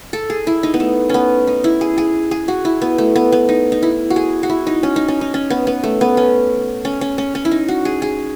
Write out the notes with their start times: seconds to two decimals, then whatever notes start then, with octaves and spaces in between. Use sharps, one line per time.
0.13 A4
0.30 G#4
0.47 E4
0.63 D#4
0.74 B3
0.80 A3
1.09 B3 C#4
1.47 D#4
1.64 E4
1.81 G#4
1.98 G#4
2.31 G#4
2.48 F#4
2.65 E4
2.82 B3
2.98 A3
3.16 B3
3.32 B3
3.49 D#4
3.72 D#4
3.83 E4
4.10 F#4
4.16 G#4
4.43 F#4
4.50 E4
4.67 D#4
4.83 C#4
4.96 D#4
5.08 C#4
5.21 D#4
5.34 C#4
5.50 B3
5.67 B3
5.84 A3
6.01 B3
6.17 C#4
6.85 C#4
7.01 C#4
7.18 C#4
7.35 C#4
7.45 E4
7.51 D#4
7.68 F#4
7.85 G#4
8.02 G#4